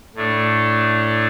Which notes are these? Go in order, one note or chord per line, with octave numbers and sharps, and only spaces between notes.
A2 A3 D4